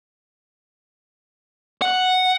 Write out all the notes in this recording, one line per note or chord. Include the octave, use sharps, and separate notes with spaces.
F#5